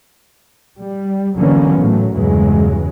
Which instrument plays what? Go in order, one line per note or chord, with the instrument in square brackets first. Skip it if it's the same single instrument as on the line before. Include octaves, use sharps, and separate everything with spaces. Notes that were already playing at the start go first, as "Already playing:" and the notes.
[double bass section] G3
D3 E3 F#3 A#3 B3 C#4
A2 F#3 A3
E2 G2 C#3 E3 F#3 G#3